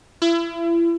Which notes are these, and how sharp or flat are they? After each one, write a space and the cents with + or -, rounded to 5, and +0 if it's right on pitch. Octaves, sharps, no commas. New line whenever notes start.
E4 +35